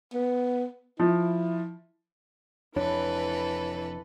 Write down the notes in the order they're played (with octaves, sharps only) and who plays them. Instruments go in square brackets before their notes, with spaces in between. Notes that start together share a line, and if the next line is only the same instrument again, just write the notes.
[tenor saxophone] B3
[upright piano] F3 [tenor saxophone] E4
[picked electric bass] F1 F2 D4 [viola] E3 [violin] A4 B4 [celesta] C#5